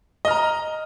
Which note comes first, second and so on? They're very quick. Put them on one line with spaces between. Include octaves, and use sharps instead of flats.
D#5 F6 A#5